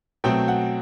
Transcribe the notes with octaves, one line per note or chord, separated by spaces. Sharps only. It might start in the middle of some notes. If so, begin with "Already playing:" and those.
B2 F#3 A3 C4 G5
F#5